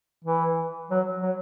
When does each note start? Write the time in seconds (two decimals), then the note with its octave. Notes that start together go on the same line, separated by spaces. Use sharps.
0.24 E3
0.91 F#3
1.22 F#3